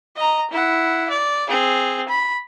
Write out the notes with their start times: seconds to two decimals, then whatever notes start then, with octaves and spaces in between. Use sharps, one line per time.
0.16 D#5 A#5
0.51 E4 F#5
1.10 D5
1.49 C4 G#4
2.08 B5